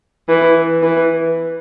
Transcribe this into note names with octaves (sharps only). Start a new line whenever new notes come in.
E3
E3